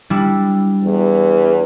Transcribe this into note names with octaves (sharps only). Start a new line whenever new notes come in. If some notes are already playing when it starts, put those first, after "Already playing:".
G3 D4 E4
E2